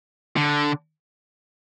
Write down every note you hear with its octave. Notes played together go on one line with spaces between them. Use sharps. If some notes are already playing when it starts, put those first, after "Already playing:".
D3